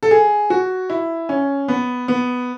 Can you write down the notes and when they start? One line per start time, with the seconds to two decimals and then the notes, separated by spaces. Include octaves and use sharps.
0.03 A4
0.11 G#4
0.50 F#4
0.90 E4
1.29 C#4
1.68 B3
2.08 B3